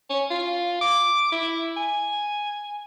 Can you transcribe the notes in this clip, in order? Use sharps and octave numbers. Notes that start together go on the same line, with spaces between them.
C#4
F4
D6
E4
G#5